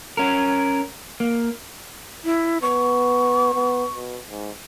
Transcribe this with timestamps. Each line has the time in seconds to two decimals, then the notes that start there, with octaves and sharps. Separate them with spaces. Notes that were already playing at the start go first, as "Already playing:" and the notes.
0.17 C#4 A#4
1.20 A#3
2.24 E4
2.62 B3 C#6
3.53 B3
3.92 B2
4.28 G#2